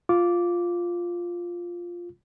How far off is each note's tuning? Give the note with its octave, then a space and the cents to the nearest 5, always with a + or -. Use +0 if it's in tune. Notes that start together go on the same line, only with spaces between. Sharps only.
F4 +0 D6 -10